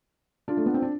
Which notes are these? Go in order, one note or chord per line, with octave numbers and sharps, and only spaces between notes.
D4 F4
A3
B3
C4
D4